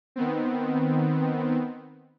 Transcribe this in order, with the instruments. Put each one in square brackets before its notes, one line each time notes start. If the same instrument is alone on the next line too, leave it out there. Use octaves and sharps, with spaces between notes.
[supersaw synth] D#3 B3 C4